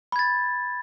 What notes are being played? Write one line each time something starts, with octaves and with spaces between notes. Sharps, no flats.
B5 G#6 A6